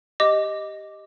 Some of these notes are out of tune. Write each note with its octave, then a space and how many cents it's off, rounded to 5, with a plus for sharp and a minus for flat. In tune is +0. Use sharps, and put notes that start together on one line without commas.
G4 +0 D#5 +0 D6 +0